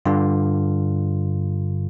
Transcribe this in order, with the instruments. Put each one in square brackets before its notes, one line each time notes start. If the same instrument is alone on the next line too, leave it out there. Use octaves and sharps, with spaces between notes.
[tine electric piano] G2 D3 F4